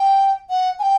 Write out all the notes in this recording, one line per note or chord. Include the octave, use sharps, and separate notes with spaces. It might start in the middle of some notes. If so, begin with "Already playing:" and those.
Already playing: G5
F#5
G#5
G5